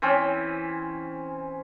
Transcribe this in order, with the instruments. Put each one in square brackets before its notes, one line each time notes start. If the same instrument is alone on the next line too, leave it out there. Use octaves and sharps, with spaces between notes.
[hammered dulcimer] E3 C4 C#4